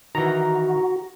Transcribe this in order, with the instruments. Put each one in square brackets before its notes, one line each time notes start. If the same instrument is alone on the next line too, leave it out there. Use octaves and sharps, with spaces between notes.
[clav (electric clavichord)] D#3 E3 [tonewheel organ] F#4 [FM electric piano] A#5